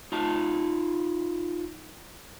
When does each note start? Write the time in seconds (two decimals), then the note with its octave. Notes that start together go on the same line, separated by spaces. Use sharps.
0.12 D#4 F4 A5